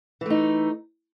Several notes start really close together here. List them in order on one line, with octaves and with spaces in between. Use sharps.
E3 A3 D#4